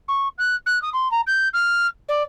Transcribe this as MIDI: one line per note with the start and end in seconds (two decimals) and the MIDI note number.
0.08 0.28 85
0.38 0.55 90
0.66 0.81 90
0.82 0.89 87
0.93 1.11 84
1.11 1.21 82
1.27 1.48 91
1.53 1.87 89
2.08 2.22 74